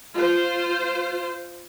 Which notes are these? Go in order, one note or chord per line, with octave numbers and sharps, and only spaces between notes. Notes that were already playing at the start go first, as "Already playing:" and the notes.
F4 C5